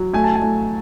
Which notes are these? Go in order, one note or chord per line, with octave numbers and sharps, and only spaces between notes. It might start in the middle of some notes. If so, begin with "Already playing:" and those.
Already playing: F#3
A3 G#5
A5
G#5
A3